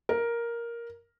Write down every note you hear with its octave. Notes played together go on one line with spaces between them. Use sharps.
A#4